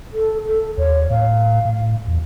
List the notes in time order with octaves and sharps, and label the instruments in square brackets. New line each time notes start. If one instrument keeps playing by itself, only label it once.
[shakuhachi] A4
A4
[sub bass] D#2 [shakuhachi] C#5
[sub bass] A2 [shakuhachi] F5
[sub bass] A2
E2